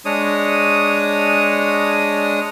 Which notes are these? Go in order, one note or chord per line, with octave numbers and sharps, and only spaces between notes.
G#3 D4 C#5 D#6